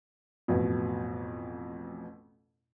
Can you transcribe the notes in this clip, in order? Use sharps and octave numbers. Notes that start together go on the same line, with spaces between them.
A1 F2 B2